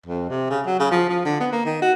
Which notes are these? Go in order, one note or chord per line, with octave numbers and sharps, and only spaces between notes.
F2
C3
C#3
F#3
C#3
F3
F3
D3
B3
A#3
D#3
F#4